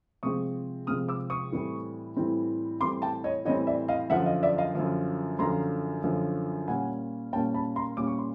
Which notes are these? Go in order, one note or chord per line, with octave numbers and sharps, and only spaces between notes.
C3 F3 G#3 C4 C#6 D#6
C3 F3 G#3 C4 D#6 F6
D6 E6
C#6 D#6
A2 E3 G3 C4
A2 E3 G3 C4
A2 E3 G3 C4 C6 D6
G5 A5
C#5 D#5
A2 E3 G3 C4 C#5 D#5
D5 E5
D#5 F5
F#2 D3 F3 E5 F#5
D#5 F5
D5 E5
D#5 F5
F#2 D3 F3
F#2 D3 F3 A#5 C6
F#2 D3 F3
A#2 G3 A#3 C#4 F#5 G#5
A#2 G3 A#3 C#4 G5 A5
A5 B5
A#5 C6
A#2 G3 A#3 C#4 D6
C#6
C6